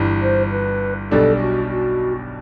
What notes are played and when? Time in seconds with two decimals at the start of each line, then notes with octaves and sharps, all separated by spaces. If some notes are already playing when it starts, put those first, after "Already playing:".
Already playing: G1 G2 E3
0.22 C5
0.51 B4
1.11 B1 B2 G3 D4 A4
1.41 F#4
1.71 F#4